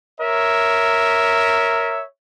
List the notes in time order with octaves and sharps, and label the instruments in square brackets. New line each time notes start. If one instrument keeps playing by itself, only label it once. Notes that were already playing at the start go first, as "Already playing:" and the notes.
[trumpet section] A#4 C#5 E5